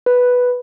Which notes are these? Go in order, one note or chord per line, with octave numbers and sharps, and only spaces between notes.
B4